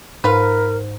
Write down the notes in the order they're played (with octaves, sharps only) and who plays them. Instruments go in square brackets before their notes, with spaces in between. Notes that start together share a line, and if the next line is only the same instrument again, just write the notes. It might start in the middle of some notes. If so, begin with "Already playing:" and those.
[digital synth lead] G#2 [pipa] F4 B4 [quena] A#4